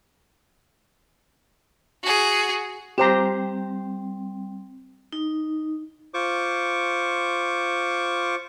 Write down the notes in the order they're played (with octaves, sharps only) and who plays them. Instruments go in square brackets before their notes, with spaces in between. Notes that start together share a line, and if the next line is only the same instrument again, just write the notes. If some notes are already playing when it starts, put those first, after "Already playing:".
[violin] F#4 G#4
[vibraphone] G3 C4 [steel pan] G4 C5 A#5
[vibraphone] D#4
[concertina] F4 C5 C#6 D6